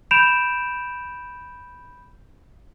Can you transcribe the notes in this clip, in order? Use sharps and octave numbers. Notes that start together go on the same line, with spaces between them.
B5 G6 D7 E7 F7